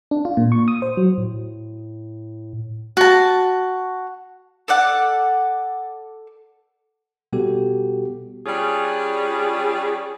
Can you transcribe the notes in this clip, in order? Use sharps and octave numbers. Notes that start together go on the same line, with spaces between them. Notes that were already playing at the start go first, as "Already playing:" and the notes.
D4
F4
A#2
C#6
D#6
C5
F#3
A2
F#4 A5
A4 D5 F#5
B2 G3 B3 F#4 G4 A4
G3 C#4 D4 F4 G#4